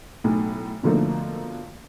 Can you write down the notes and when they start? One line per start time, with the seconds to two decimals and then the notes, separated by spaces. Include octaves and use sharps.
0.24 B1 A2
0.83 B2 D3 F3 A3 A#3